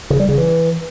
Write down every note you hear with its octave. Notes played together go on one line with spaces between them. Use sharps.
C#3
G3
C#3
E3